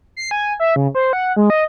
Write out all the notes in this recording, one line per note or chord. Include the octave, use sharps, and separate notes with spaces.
C7
G#5
E5
C#3
C5
F#5
G#3
D#5